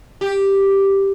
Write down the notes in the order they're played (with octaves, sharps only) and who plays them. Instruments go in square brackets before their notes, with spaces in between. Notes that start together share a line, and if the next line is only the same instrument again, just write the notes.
[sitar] G4